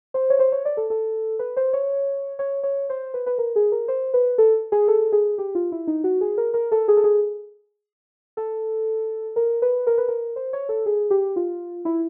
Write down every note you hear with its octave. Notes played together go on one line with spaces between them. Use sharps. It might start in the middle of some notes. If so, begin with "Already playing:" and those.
C5
C#5
C5
C#5
D5
A4
A4
B4
C5
C#5
C#5
C#5
C5
B4
B4
A#4
G#4
A#4
C5
B4
A4
G#4
A4
G#4
G4
F4
E4
D#4
F#4
G#4
A#4
A#4
A4
G#4
A4
G#4
A4
A#4
B4
A#4
B4
A#4
C5
C#5
A4
G#4
G4
F4
E4